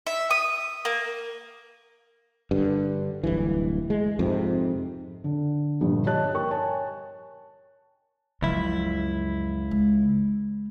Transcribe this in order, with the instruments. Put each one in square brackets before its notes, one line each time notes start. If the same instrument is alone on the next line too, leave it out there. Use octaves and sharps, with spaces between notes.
[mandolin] E5
D#6
A#3
[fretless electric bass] G2 D3
D1 G2 E3
G#3
F2 G#2 C3
[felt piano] D3
A#1 G2 A#2 D3
G4 C#5 D#5 A5 F#6
A#4 G5 C#6
C#5 G#5 A5
[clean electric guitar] C#2 E4 [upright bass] F#2 F3
[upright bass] G#3